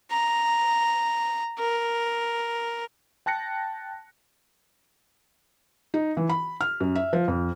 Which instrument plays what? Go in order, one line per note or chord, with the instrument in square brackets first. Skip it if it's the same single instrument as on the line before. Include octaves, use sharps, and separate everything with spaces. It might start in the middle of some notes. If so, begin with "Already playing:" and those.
[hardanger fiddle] A#5
A#4
[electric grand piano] G5 A5 F#6 A#6 C#7
[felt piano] D#4
E3
B5
F6
F#2
E5
F3
F2